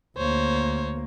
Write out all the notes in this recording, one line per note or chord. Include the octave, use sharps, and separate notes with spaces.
D2 A#3 C5 C#5